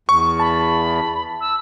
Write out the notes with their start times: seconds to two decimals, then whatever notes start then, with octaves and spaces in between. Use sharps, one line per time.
0.09 E2 C#6
0.40 A5 B5
1.41 E6